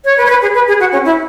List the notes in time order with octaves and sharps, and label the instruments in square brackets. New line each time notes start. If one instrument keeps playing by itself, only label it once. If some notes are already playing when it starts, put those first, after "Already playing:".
[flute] C#5
B4
C#5
B4
G#4
B4
G#4
F#4
C#4
E4